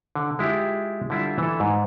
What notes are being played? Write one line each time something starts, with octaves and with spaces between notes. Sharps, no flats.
D3
G#3 E4 F4 G4
D3 G3 E4 F4 E5
E3 A4
G#2